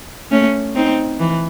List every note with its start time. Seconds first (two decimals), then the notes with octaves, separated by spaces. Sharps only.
0.31 A3 C#4
0.75 C4 D#4
1.19 E3